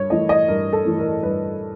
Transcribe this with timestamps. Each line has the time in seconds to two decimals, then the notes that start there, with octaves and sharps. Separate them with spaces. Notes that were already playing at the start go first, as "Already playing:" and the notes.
Already playing: G2 C#5
0.10 E3 A3 D#5
0.29 D#5
0.48 G2 A#4
0.73 A4
0.85 E3 A3
0.99 A#4
1.23 G2 B4